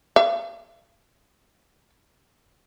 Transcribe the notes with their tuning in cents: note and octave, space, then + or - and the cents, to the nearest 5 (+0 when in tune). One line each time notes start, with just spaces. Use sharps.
F5 -45